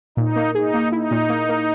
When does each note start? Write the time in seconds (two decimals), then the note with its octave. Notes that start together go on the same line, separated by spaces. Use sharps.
0.17 A#2 D#4
0.36 A#3
0.54 D#4 G#4
0.74 A#3
0.92 D#4 E4
1.11 A#2
1.29 A#3
1.49 A#3